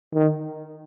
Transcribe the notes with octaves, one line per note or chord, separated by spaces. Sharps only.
D#3